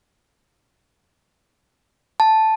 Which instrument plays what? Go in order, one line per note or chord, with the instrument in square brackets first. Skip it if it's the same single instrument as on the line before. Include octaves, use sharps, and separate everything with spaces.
[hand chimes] A5